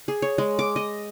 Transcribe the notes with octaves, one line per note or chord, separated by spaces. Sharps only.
G#4
C#5
G#3
D6
D#5